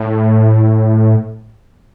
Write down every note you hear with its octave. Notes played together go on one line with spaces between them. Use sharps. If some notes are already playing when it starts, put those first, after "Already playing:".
Already playing: A2